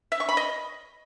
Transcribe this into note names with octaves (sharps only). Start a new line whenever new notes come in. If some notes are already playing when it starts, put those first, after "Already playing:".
E5
C#6
B5
D#5